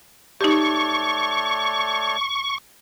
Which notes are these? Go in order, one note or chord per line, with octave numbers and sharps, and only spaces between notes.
A3 D#4 G4 C#5 D5 C#6